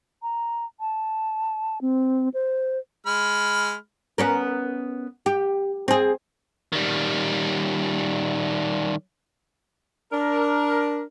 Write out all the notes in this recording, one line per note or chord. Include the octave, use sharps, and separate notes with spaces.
A#5
A5
C4
C5
G#3 B5 F6
B3 C#4 A#4
G4
C4 G#4
D#3 G3
D4 A#4